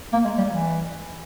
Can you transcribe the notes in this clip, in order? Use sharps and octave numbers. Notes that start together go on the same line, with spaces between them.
A#3
G#3
G3
E3